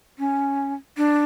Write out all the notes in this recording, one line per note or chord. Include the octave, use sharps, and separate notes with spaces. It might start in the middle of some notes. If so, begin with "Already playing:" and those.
C#4
D4